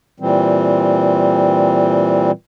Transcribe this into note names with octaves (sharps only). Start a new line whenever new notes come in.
A#2 E3 G3 C4